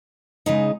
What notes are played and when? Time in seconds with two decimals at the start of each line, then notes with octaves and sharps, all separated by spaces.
0.46 C#3 G#3 D#4